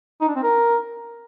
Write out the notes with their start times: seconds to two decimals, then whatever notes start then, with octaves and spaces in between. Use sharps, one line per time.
0.21 D#4
0.28 D4
0.36 C4
0.43 A#4